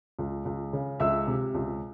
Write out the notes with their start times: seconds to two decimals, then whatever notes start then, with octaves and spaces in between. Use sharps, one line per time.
0.19 C#2
0.45 C#2
0.73 C#3
1.00 C#2 E5 E6
1.27 C3
1.55 C#2